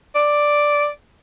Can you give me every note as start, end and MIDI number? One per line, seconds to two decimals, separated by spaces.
0.15 0.87 74